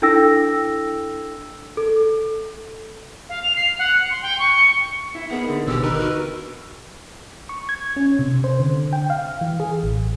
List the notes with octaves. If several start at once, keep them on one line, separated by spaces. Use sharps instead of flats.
D4 E4 A4 G5 E6 A#6
A4
F5
F7
C7
F#5
C#7
C6
G5
C#6
C#7
E4
A#3 B3 D#4 G#4 A#4
D3
D#1 G#1 B2 B3 G4 E6
D#4 A#4 B4
F#4
C#6
G#6
C#4
C3
C5
D3
G5
F5
E3
G#4
A1